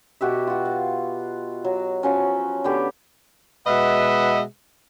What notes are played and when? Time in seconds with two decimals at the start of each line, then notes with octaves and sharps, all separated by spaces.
0.21 B2 F#4 G4 E5
0.47 F4 F#4
0.65 F5
1.65 F#3
2.03 F3 F#3 C#4
2.64 D3 B3 G4 B5
3.66 B2 G#3 B4 D#5 E5 F#5